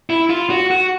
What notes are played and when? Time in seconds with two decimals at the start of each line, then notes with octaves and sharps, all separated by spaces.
0.10 E4
0.30 F4
0.50 F#4
0.71 F#4